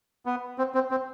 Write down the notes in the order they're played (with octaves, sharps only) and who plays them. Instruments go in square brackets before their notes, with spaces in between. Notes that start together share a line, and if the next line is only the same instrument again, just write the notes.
[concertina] B3
C4
C4
C4